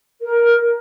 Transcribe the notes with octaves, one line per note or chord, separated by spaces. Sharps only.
A#4